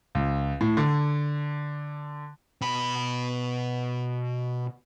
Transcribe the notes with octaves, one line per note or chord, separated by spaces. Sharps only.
C#2
A2
D3
B2 B5